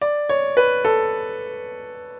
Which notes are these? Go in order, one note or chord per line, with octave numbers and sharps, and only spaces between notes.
D5
C#5
B4
A4